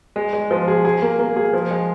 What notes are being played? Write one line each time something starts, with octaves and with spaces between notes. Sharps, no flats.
G#3
G#3
F3
G#4
G#4
A#3
A#3
G#4
F3
G#3